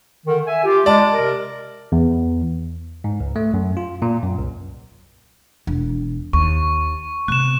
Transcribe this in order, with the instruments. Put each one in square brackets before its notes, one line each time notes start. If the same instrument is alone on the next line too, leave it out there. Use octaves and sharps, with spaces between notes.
[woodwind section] D3 D#3
E5 G#5
F4 G4
[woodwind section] G#3 [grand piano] D5 A5
[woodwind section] C3 A#4
[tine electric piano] E2
G#2
C#2
A3
F#2
F4
A#2
F#2
C2
[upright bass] E1
[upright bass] D#2 [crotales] C#6
[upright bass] C3 B3 [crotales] F#6 E7